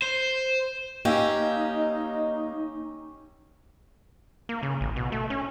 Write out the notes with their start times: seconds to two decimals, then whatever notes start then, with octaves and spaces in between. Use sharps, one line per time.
0.02 C5
1.05 A#3 C#4 D#4 G4 D#5 F5 E6
4.49 A#3
4.63 C#3
4.81 A1
4.96 B2
5.12 A3
5.30 C#4